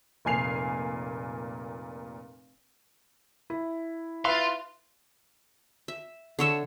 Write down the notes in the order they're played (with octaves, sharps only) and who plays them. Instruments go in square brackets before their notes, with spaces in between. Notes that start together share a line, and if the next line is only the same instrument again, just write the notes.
[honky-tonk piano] F1 A#2 G#5 C7 F7
[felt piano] E4
[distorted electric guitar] F4 F5 [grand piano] B4 E5 [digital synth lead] C6
[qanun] E5
D3 C#5 E5 A5